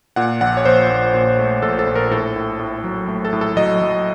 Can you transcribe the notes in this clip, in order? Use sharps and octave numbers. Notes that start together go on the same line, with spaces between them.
A#2 F#5
A#1 F#5
C#5
A#1 C5
A#1
A#2
A3
A#1 A4
A4
A#1
A#4
A2 A4
A2
A2
F#3
A3
A4
A2
A4
F#3 D#5
F#3